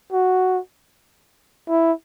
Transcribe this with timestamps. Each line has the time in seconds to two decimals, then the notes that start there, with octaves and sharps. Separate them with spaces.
0.13 F#4
1.69 E4